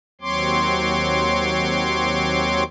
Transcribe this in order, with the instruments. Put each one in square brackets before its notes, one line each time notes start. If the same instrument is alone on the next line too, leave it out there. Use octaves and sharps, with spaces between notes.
[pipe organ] D#2 F#3 C4 C#5 C6 D6